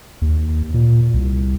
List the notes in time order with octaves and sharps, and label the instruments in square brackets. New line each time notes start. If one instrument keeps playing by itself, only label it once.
[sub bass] D#2
A#2
C2